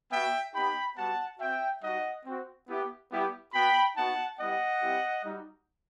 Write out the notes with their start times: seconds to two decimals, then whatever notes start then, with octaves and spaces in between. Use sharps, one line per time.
0.11 B3 F#4 E5 G5
0.54 B3 D#4 G4 G5 B5
0.96 G3 B3 F#4 F#5 A5
1.39 C4 F#4 E5 G5
1.82 G3 D#4 F#4 D#5 F#5
2.25 C4 F#4
2.68 B3 E4 G4
3.11 G3 B3 E4 G4
3.54 B3 F#4 G5 B5
3.96 B3 D#4 F#4 F#5 A5
4.39 G3 B3 E4 G4 D#5 F#5
4.82 G3 C4 E4 G4
5.24 G3 D#4 F#4